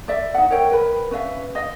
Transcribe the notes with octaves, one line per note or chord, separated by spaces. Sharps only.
D5 E5
D#4 F#5
A#4 C#5 E5 G5
A#4 B4 B5
C#4 B4 E5 F5
D#5 F5